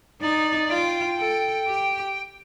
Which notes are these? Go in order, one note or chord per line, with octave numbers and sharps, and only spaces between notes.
D#4 D5
F4 G5
A4
G4